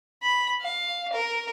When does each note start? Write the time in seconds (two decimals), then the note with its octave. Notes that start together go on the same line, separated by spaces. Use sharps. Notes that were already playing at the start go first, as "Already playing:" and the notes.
0.23 B5
0.61 F5
1.13 A#4